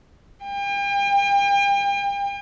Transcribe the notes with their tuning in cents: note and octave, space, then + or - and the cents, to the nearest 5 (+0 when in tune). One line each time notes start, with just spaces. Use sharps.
G5 +40